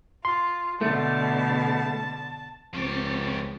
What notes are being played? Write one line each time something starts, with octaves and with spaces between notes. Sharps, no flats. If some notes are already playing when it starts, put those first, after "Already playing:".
F4 C6
B2 D3 A3 A5
C#2 F3 C4 G4 C#6 A6